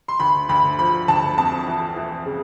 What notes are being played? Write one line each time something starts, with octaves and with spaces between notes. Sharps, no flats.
C6
D2 B5
D2 B5
F3 B5
D2 A5
F2 A5
E3
E3
C#3